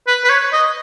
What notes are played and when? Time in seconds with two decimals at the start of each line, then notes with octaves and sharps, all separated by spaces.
0.07 B4
0.24 B4
0.29 C#5
0.53 D#5